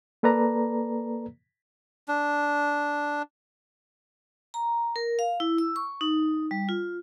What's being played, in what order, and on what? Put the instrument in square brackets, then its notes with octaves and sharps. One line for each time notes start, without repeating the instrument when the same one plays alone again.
[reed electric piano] A#3 A4 B4 D5 A#5
[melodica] D4
[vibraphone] A#5
A#4
F5
E4
E6
C#6
D#4
G3
F4